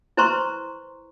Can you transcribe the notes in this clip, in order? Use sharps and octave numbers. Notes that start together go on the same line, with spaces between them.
E4 B4 C5 A#5 C6 C#6